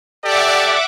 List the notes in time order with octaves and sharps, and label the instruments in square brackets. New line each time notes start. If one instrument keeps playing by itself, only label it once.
[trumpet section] G4 A4 D5 [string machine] E5 F#5 D6